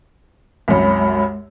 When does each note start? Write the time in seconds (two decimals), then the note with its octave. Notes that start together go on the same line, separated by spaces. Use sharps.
0.68 C2 F#2 G#3 C#5 B5